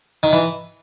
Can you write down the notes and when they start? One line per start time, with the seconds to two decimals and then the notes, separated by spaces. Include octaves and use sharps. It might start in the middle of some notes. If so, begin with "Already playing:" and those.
0.23 D#3
0.33 E3